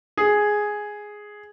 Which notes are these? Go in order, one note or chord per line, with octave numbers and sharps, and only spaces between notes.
G#4